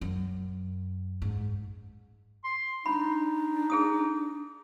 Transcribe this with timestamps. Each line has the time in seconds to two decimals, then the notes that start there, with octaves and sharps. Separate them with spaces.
0.01 F#2
1.22 G#2
2.44 C6
2.86 D4 D#4 B5
3.70 G#4 A4 D#6